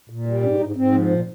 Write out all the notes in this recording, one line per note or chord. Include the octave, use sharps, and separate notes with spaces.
A#2
G3
G#2 C#4
G#2 D#4
G#2 C4
F3
A#2